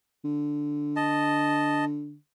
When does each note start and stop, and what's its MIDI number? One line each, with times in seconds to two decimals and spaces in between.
0.24 2.15 50
0.96 1.85 75
0.96 1.85 81